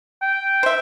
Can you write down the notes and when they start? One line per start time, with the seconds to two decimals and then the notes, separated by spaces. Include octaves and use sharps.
0.22 G5
0.63 C5 E5